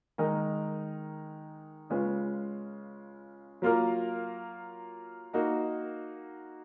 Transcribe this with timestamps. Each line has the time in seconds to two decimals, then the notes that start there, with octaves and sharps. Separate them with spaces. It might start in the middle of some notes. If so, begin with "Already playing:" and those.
0.18 D#3 G#3 D#4 A#4 D#5
1.90 C#3 G#3 C#4 F4 B4
3.62 F#3 A#3 F4 A#4
5.33 A#3 D#4 F#4